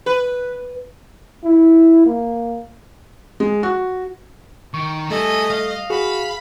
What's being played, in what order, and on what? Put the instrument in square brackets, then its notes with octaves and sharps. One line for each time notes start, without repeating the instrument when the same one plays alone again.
[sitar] B4
[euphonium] E4
A#3
[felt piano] G#3
F#4
[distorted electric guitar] D#3 [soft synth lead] C#6
[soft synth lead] G3 [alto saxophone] A3 [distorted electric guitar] G#4 A4 [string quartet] D#5
[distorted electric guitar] F5
[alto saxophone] F#4 [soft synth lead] G#4 [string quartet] B5